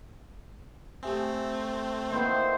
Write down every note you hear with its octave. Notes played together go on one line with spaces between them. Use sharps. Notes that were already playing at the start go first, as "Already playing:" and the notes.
A3 C4 G4 E5 G#5
D#3 F3 A#3 E4 B4 C5 F#5